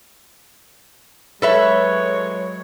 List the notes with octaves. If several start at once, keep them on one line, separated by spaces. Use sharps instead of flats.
F#3 G#3 A4 B4 C#5 E5